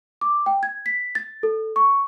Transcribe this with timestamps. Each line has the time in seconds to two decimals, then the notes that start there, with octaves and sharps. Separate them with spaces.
0.21 D6
0.46 G5
0.63 G#6
0.86 B6
1.15 A6
1.43 A4
1.76 C#6